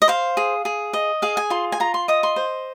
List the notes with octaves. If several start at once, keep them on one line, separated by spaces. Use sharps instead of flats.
D#5
C5 F5
G#4
G#4
D#5
G#4 F5
G#5
F4 C6
G#5
F4 A#5
C6
D#5 D#6
C6
C5